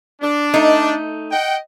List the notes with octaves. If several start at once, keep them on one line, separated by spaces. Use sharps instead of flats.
D4
A3 D#4
D#5 F#5 G5